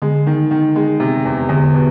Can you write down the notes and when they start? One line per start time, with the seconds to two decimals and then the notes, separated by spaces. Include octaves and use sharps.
0.02 D3 G#3
0.26 D#3
0.51 D#3
0.76 G#3
1.00 C3
1.25 E2
1.49 E2 D3
1.74 B2